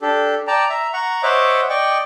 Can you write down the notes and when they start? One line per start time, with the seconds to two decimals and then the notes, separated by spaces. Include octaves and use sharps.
0.01 D4 G4 A4
0.47 D5 G5 A5 A#5
0.70 E5 A#5
0.94 F#5 A#5 C#6
1.23 C5 C#5 D#5 E5 F#5 D6
1.69 D5 D#5 G5 C#6